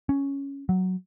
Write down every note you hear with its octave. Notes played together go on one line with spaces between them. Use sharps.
C#4
F#3